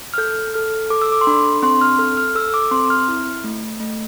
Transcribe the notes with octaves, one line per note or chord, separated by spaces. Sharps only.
F6
A4 G6
A4 F6
A4 D6
E6
D6
C6
D4 B5
C4 C6
F6
A4 F6
F6
A4 E6
D6
C4 C6
F6
E4
A3
A3